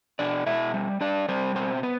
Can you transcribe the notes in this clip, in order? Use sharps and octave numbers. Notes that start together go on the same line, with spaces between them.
B2 D4 D5
B2 E4 E5
G3
G3 D4 D5
G3 C4 C5
B2 C4 C5
B3 B4